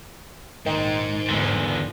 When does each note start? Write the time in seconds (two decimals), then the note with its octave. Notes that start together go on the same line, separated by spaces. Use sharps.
0.66 A#1 G#2 D#3
1.30 G#1 E2 D3 F3